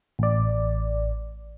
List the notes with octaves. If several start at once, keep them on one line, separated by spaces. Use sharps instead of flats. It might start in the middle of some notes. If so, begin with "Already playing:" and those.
A1 D5